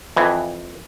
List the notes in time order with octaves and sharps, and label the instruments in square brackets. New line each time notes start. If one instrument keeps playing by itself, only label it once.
[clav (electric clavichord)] F2 E3